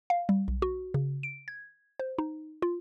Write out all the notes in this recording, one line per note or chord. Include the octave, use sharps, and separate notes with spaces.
F5
G3
B1
F#4
C#3
D7
G#6
C5
D#4
F4